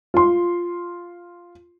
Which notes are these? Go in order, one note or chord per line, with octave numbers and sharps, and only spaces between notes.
F4 C6